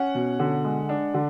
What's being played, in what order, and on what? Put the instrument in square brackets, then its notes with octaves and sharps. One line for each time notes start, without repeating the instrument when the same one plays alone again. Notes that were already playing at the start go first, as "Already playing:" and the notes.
Already playing: [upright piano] C#4 F#5
B2
D3
G#3
D4
D3